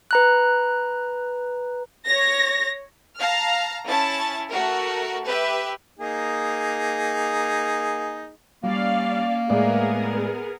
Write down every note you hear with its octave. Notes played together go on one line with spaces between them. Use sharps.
B4 A#5 F#6
C#5 A#6
F5 A5 A#5 F6
C#4 E4 A5 A6
A3 F#4 A#4
G4 B4 E5
A#3 D#4 G#4
G3 A#3 C#4 D5 F5
A2 G#3 B3 G#4 A#4 D5